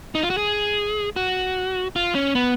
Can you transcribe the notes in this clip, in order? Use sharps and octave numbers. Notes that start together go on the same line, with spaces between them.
D#4
F4
F#4
G#4
F#4
F4
C#4
B3